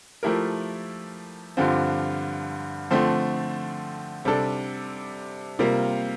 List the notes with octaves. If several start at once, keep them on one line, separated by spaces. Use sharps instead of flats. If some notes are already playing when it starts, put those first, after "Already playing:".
F3 A3 E4 G4 A#4
G2 D3 F3 C4 F4
D3 F3 A3 C4
C3 G3 D4 A4
C3 G3 A#3 F4 A#4